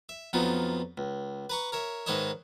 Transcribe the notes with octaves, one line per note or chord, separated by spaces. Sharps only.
E5
F2 F#3 B3 D#4 F4
C#2
B4 A#5 C#6
A#4 C#5 E5
G#2 D#3 B4 C#5 D#5 E5